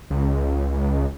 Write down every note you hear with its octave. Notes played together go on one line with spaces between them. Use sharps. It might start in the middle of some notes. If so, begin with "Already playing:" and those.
C#2